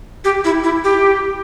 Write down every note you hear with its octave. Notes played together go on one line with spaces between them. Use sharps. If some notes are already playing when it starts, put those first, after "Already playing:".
G4
E4
E4
G4